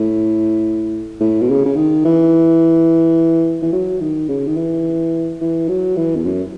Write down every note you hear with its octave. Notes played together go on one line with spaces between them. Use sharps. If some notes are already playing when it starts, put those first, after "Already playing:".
Already playing: A2
A2
B2
C#3
C#3
D#3
E3
E3
F#3
D#3
C#3
D#3
E3
E3
F#3
E3
E2
F#2